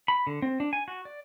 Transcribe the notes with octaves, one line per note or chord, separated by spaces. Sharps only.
B5
D3
C4
D4
G#5
F#4
D5